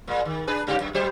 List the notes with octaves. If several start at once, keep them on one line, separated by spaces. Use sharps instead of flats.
A#2 G#3
D#3
D4 G#4 B4
G2 C#3 G4
F#2
F#3 G4 C5